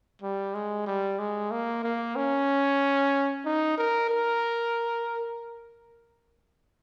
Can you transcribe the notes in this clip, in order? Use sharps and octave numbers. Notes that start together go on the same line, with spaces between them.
G3
G#3
G3
G#3
A#3
A#3
C#4
D#4
A#4
A#4